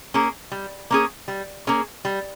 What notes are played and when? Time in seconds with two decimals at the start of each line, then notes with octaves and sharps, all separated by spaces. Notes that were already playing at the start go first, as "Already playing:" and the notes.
0.14 A#3 C#4 G#4
0.52 G3
0.91 A#3 C#4 G#4
1.28 G3
1.67 A#3 C#4 G#4
2.05 G3